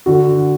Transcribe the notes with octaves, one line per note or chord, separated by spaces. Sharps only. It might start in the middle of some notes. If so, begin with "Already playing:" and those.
D3 F#4